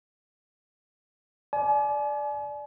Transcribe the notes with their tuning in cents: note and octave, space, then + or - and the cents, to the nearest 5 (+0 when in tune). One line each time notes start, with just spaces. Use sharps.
D5 +0 G#5 +40